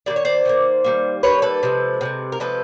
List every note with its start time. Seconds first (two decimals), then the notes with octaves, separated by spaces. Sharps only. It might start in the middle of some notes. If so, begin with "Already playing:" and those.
0.06 G3 A#3 D5
0.10 D#3
0.16 C#5
0.25 C5 D5
0.45 D#3 G3 A#3
0.84 D#3 G3 A#3
1.23 D#3 G3 A#3 B4 C#5
1.42 A4 B4
1.63 C3 F3 G#3
2.01 C3 F3 G#3
2.32 A#4
2.40 C3 F3 G#3 A4 B4